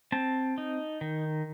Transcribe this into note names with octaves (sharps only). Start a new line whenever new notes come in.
C4 A5
D#4
D#3